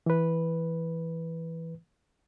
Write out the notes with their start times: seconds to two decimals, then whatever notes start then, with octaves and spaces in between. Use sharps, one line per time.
0.06 E3 B4